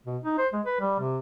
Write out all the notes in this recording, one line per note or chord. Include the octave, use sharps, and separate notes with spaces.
B2
D#4
C5
G#3
B4
G3
C3